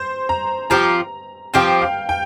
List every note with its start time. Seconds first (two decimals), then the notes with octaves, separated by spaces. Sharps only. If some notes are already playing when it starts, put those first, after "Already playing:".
Already playing: C5
0.29 A#5
0.70 F3 C4 G4 A#5
1.54 F3 C4 G4 G5
1.82 F5
2.09 G5